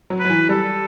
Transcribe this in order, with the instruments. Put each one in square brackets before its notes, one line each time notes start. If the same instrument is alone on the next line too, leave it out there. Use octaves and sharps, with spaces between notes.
[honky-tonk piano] F#3
[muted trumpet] B4
[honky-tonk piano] F#3
E3
[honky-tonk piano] G3 [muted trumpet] A4